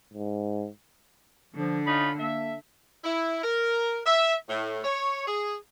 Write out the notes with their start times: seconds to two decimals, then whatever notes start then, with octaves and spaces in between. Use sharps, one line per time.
0.14 G#2
1.54 D3 F3
1.86 C#4 D#4 F4 B5
2.19 A#3 A4 E5
3.04 E4
3.43 A#4
4.06 E5
4.48 A2
4.84 C#5
5.27 G#4